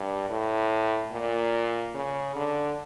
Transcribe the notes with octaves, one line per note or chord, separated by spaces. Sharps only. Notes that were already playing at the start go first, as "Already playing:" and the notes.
Already playing: G2
A2
A#2
C#3
D3